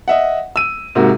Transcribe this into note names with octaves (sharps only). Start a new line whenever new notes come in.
D#5 E5 F#5
E6 D#7
G#2 C3 A#3 F#4